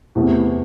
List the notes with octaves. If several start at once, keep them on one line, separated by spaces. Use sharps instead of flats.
E2 C3 E3 A3